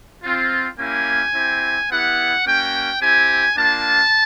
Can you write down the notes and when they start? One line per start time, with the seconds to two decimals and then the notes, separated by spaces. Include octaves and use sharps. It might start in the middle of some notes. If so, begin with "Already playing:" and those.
0.23 C4 F4
0.79 A#3 C#4 E4 G4 G#5
1.34 C4 E4 G4
1.91 B3 E4 G4 F#5
2.46 A#3 C#4 F#4 G5
3.02 C4 E4 G4 G#5
3.57 A#3 D4 F4 A5